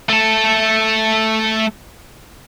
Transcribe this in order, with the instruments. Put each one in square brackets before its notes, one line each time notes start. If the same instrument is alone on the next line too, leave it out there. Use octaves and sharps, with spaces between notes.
[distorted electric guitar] A3 A4